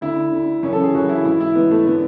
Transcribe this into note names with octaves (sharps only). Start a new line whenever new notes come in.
D2 D3 E4
D2 D3
F#2 C#3 E3 C#4
A4
G#4
F#2 C#3 E3 F#4
E4
G#2 E3 E4
E4
G#2 E3 B3
A3
D3 B3